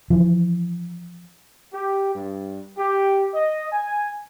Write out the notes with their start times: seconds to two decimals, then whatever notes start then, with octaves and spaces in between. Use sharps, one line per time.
0.10 E3 F3
1.73 G4
2.14 G2
2.77 G4
3.34 D#5
3.72 G#5